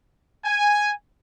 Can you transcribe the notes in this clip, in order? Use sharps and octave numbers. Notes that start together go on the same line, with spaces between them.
G#5